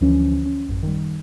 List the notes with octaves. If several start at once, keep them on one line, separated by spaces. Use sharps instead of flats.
D2 D3 E3 F3 C#4
C#4
A1 F#2
D#3 G3